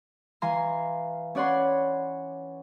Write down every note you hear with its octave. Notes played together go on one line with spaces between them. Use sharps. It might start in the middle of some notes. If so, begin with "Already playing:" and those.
E3 F5 G#5 A#5 C6
C#4 C#5 D5 F#5 B5 C6